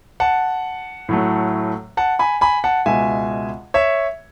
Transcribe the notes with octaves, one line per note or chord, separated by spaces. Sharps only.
F#5 A5
A2 F#3 A3
F#5 A5
G#5 B5
G#5 B5
F#5 A5
C#2 B2 G#3 E5 G#5
C#5 E5